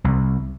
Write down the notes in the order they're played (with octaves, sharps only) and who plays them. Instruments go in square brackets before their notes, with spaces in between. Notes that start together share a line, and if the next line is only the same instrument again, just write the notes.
[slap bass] C2